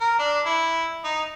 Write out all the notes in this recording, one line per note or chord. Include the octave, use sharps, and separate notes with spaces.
A#4
D4
E4
D#4